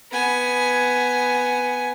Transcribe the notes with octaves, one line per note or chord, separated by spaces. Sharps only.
B3 G#5